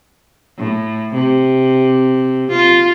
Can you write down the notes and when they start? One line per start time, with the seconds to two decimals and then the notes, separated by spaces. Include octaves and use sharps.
0.58 A2
1.14 C3
2.51 F4